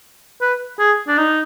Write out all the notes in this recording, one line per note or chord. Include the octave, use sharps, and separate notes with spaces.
B4
G#4
D4
D#4